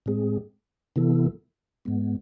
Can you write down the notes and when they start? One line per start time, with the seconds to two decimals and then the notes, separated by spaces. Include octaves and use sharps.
0.06 A2 G#3 C4 G#4
0.96 C3 E3 B3 E4 A4
1.85 G#2 G#3 B3